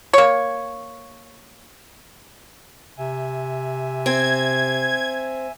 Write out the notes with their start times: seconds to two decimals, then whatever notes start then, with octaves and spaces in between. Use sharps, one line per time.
0.13 A#3 C#5
2.98 C3 E5 G#5
4.06 C4 G#6